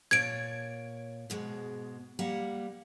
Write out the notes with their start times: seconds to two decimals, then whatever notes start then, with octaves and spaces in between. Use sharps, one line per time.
0.11 A#2 C#5 A5 G#6 D7
1.30 G#2 B2 G#3
2.19 G3 A#3 F#5